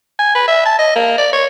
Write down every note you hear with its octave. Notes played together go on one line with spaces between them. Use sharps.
G#5
B4
E5
A5
D#5
A#3
D5
C#5